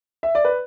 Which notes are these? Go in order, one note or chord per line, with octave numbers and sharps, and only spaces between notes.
E5
D5
B4